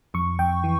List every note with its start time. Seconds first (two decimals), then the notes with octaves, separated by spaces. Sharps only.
0.14 F2 C#6
0.39 F2 G5
0.64 E3